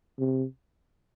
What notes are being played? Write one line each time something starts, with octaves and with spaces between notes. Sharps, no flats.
C3